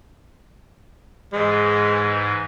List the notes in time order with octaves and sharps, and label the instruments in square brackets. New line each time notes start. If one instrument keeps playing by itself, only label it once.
[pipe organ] G#2 E3 [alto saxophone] G#3